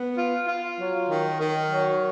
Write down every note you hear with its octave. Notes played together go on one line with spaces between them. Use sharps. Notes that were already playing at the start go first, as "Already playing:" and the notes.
Already playing: B3
F4
F4
F#3
D#3
D#3
F#3